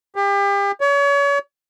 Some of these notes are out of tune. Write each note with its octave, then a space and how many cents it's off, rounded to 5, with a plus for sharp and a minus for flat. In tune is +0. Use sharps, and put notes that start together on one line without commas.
G4 +35
C#5 +35